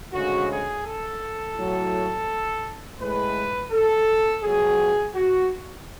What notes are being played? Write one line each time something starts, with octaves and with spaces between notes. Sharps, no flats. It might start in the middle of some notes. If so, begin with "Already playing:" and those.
D2 C#3 G#3 F#4
G#4
A4
A2 F#3
A2 G#3 B4
A4
C#2 B2 F#3 G#4
F#4